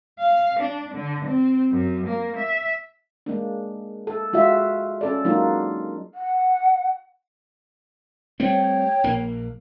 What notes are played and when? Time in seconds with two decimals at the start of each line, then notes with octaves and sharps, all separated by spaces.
0.19 F5
0.60 D4
0.95 D3
1.25 C4
1.71 F#2
2.07 A#3
2.36 E5
3.26 G#3 A#3 D4
4.07 A4
4.33 G#3 F4 F#4 E5
5.01 C#4 A4 D5
5.25 F#3 G#3 A#3 D4 D#4 F4
6.14 F#5
8.40 G3 A3 C4 C#5 G5
9.04 A#1 A#3